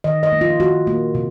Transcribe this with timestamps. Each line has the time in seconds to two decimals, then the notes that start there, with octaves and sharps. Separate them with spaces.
0.04 D#3 D#5
0.23 D#5
0.32 A#3
0.41 F4
0.60 D#3 F#4
0.87 A#3
1.15 C3